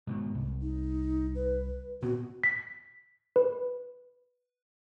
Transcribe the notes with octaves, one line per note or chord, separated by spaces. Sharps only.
G#2 B2 D#3
C2
D#4
B4
A#2 B3 C4 F#4
B6
B4